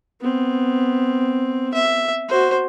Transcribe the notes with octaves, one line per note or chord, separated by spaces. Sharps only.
B3 C4
E5
F#4 C5